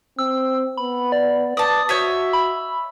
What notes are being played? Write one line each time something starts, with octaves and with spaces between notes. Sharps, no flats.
C4 E6
B3 B5
D5
B4 D5 A5 D#6
F#4 C#5 D#5 E5
B5